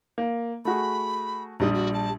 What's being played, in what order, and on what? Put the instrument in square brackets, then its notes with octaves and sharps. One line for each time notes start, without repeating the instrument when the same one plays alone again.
[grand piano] A#3
[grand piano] A3 F#4 G#4 [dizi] B5
[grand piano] A#1 G3 D#6 [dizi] D#4
[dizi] F#4
A5